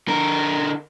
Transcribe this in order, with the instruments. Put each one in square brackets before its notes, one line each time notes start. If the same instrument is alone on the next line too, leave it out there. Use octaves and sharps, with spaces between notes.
[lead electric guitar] D3 A#4